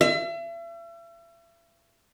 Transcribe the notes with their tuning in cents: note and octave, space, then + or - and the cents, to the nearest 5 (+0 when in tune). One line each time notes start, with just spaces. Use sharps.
E5 +40